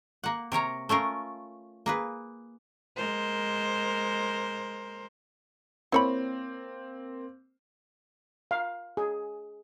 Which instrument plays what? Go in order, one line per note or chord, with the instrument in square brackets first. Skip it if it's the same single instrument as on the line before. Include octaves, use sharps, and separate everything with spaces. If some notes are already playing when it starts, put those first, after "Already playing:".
[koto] A#3 F#5
C3 A#4 C#5 A#5
A3 C#4 F4 A#4
A#3 G#4 B4
[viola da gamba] G#3 A#4 C5
[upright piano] A#3 C4 [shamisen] E4 C#5 B5
[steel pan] F5
G#4